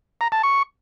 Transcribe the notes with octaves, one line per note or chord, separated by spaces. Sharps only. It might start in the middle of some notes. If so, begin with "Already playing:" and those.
A#5
A5
C#6